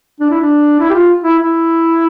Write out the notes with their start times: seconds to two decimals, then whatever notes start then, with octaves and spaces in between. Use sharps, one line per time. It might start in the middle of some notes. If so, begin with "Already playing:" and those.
0.20 D4
0.31 E4
0.41 D4
0.79 E4
0.90 G4
0.94 F4
1.24 E4
1.39 E4